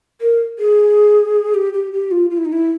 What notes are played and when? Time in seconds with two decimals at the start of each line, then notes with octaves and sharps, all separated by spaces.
0.21 A#4
0.59 G#4
1.54 G4
1.73 G4
1.93 G4
2.11 F4
2.30 F4
2.37 E4
2.45 D#4
2.53 E4